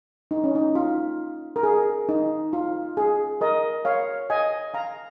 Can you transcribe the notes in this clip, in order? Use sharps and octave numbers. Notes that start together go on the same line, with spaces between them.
D#4
C#4
D#4
F4
A#4
G#4
D#4
F4
G#4
A#4 D#5
C#5 F5
D#5 G#5
F5 A#5